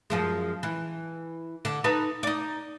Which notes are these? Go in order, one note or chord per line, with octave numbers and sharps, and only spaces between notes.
F#2 F3 G#3
E3
D3
D#4 A4 B4
D#4 D5